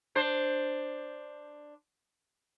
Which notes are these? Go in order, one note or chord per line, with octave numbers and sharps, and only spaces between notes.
D4 C5